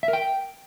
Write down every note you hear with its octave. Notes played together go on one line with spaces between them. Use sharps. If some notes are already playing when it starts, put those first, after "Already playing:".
E5
A#4
G5